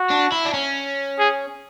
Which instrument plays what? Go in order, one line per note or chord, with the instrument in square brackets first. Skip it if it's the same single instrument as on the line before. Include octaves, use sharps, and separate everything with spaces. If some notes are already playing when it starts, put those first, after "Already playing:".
Already playing: [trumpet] F#4
[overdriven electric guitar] D4
E4
D4
C#4
[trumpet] G#4